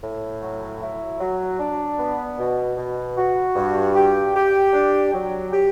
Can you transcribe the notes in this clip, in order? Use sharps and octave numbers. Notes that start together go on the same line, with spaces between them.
A2
F#3
E4
F#3
D4
B3
B2
B2
F#4
G2
G4
G4
D4
F#3
G4